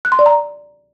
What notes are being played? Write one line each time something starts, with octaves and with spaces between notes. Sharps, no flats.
F#6
C6
D5
A#5